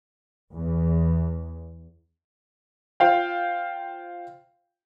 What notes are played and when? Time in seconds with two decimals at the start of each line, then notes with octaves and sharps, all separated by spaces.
0.51 E2
3.00 F4 C5 F5 G5